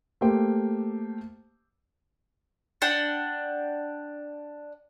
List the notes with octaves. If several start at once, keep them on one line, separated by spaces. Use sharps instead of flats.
A3 A#3 G4 C5 G5
D4 F#5 G5